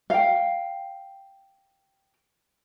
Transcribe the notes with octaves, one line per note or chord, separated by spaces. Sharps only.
F5 G5